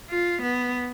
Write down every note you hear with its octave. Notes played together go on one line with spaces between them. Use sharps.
F4
B3